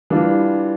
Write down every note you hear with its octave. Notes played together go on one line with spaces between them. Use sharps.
E3 G3 D4 F4